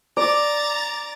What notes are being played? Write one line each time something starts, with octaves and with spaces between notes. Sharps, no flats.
D5 A#5 A6